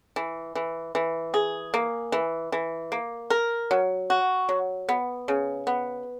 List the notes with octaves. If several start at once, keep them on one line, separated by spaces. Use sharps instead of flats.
E3
E3
E3
G#4
A#3
E3
E3
A#3
A#4
F#3
F#4
F#3
B3
C#3
B3